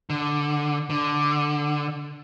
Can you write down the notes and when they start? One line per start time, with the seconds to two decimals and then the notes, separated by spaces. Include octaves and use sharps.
0.10 D3
0.90 D3